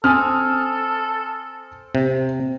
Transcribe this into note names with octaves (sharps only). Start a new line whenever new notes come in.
C4 A4 G#5 D#6 F6
C3